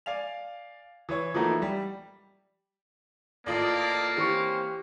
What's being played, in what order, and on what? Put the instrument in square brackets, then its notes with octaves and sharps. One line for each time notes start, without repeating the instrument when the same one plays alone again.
[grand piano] D5 F5 G#5 F7
E3 C#5
E3 F3 A3 A#3 D#4 F#4
G3
[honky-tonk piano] A1 F4 D#5 [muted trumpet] A#3 [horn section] A4 D5
[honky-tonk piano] E3 [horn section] C4 C#4 C5 [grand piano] G4 C#6 C#7